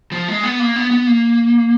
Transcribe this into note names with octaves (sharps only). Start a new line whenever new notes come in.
F3
G#3
B3
A#3
B3
B3
A#3